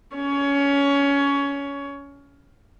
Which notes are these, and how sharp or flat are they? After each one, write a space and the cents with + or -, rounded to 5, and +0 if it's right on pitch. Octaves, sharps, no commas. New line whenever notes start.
C#4 +20 C#5 +20